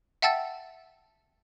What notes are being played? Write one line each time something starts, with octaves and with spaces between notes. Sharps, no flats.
E5 F#5 G5 A5 E6 A6